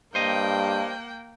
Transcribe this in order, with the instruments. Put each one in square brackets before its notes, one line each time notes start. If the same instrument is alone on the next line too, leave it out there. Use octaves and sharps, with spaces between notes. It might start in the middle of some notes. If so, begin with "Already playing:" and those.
[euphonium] G2 [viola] A#3 G5 [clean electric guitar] C5 D#5